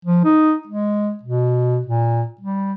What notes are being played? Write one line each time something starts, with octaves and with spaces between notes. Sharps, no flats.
F3
D#4
G#3
B2
A#2
G3